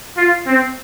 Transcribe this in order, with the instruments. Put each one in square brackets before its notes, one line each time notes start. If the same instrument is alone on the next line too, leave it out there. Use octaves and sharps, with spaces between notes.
[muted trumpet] F4
C4